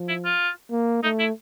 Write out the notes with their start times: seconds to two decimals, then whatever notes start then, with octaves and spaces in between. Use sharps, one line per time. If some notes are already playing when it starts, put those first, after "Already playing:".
Already playing: F3
0.09 E4
0.25 F4
0.71 A#3
1.03 A3 D#4
1.19 E4